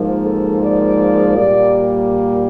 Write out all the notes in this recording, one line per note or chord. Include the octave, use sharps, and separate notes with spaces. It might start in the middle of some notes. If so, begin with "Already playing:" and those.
Already playing: G#2 F3 A#3
A4
D5
A#2 G3 A#3 D5